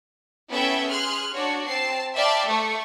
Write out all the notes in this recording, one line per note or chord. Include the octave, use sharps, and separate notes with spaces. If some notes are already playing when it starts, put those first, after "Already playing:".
B3 C#4 E4 A4 E5 G5
G#4 C6 F6 F#6
D4 F#4 C#5
C4 A5 C7
D5 E5 F5 G5 A5 B5
A3 C#6